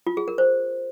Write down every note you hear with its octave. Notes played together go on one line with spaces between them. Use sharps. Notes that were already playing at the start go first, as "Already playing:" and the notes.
F4
G#4
A#4
C5